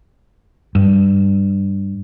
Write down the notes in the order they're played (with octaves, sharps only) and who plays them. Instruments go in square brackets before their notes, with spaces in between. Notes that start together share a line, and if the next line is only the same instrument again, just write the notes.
[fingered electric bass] G2